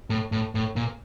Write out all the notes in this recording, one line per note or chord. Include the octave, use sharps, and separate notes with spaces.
A2
A2
A2
A#2